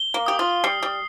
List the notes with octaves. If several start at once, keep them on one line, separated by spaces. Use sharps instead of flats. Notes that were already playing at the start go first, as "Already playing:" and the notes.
Already playing: G7
A#3
G4 D#6
F4
G3 C7
G3